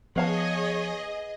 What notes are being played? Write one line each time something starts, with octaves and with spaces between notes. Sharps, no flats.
F3 B3 G#4 C#5 D#5 F5 A5